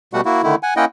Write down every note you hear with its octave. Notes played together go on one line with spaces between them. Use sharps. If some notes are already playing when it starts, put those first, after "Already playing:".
B2 G3 A3 F#4 F#5
A#3 E4 F#4
D3 D#3 A3 E4
F#5 G#5
A#3 C#4 E4 D#5 F#5 G5